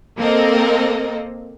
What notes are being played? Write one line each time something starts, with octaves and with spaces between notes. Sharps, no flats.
A#3 C4 A4 A#4 D#5